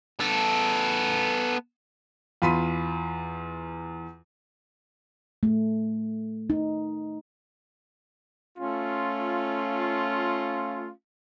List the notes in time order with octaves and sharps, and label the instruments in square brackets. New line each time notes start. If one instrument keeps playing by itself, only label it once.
[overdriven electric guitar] B3 A4
[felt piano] E2 F4 B5 C6 B6 D#7
[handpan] A3
D#4
[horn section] A3 C#4 F4